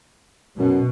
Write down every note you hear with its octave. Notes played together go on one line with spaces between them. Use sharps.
F#2 B2